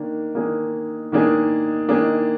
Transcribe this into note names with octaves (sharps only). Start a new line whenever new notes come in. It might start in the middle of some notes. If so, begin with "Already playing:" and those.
Already playing: D#3 A#3 D4
D#3 A#3 D4 G#4
D#3 A#3 D4 G#4
D#3 A#3 D4 G#4